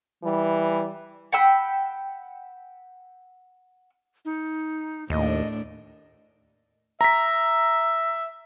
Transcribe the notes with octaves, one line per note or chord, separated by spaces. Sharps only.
E3 G3
F#5 G5 B5 E6
D#4
D#2 A2 D4 D#5
E5 A#5 B6